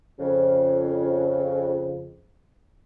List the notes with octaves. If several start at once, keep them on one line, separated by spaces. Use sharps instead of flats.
F2 C#3